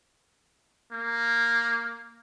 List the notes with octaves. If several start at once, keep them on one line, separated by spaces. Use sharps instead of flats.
A#3